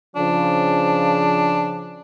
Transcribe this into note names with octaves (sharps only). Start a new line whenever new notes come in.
C#3 F3 D4